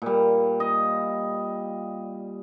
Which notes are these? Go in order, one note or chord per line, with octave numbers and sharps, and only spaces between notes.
A#2 G3
D#5